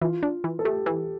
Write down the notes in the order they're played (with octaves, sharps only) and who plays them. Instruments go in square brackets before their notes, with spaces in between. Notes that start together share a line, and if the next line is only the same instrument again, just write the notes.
[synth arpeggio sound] E3 [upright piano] F4
[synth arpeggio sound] D4
E3
[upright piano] A4
[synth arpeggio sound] A3 [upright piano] G4
[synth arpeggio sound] E3